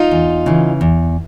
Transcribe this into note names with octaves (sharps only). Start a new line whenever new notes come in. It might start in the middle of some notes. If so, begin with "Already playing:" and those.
Already playing: D#4 F4
E2
C#3 E3
E2